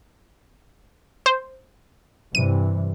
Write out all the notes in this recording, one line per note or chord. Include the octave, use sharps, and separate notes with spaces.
C5
G2 C3 E3 D#7